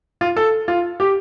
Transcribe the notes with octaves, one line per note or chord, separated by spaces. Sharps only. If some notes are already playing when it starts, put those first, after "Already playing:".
F4
A4
F4
G4